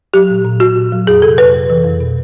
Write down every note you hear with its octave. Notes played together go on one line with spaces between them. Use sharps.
F#3 G4
A#2
A#2
A#2 F#4
A#2
F#3
F2 G#4
C3 A4
F2 B4
F2
E3
F2
B2